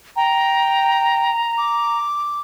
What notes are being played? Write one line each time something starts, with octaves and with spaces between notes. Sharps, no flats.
G5 A#5
D6